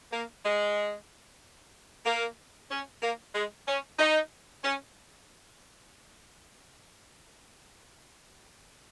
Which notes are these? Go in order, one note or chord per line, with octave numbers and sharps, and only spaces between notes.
A#3
G#3
A#3
C#4
A#3
G#3
C#4
D#4
C#4